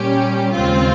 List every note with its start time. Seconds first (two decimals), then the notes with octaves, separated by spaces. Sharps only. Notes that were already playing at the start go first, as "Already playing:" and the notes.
Already playing: A#2 G3 C#4 G4
0.53 D#2 C#3 G#3 C4 F4